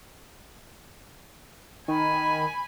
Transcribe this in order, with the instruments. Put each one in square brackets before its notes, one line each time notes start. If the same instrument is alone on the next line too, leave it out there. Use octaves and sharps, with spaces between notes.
[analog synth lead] D#3 [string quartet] G#5 B5